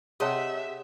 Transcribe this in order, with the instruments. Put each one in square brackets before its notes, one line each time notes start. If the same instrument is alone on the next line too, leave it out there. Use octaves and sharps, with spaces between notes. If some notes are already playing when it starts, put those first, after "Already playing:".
[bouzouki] C3 [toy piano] G#4 C#5 A5 [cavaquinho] D#5 F#5 C6 [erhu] E5